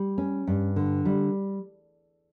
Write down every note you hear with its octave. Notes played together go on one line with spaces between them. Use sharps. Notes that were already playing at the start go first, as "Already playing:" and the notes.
Already playing: G3
C#4
G2
D3
G3